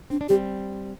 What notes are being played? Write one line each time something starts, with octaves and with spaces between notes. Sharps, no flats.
C4 D4
D4
G3 C4 G4